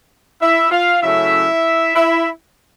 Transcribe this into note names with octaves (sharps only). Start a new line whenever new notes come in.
E4 E5
F4 F5
C#3 F#3 A3 C#4 E4 E5
E4 E5